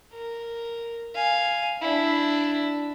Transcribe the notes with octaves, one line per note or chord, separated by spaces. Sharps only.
A#4
F5 G#5
D4 E4